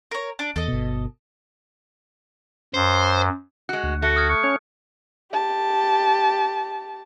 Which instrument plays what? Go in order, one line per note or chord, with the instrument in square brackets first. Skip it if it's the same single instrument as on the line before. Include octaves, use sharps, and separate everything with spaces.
[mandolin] A#4 C#5
D4
[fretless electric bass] E2 [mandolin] A4 D#5
[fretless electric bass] G1 B2
[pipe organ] F#2 [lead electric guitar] C5
[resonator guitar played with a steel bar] G#3 F#4 [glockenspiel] F#6
[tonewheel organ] D2
[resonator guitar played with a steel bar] A3 [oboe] F#4 [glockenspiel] F#6
[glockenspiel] D#6 F6 G#6
[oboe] C#6
[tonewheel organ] C#4 C#5
[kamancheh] G4 A5